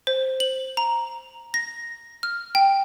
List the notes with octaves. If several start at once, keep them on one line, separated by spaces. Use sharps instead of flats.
C5
F#7
A#5
A#6
F6
G5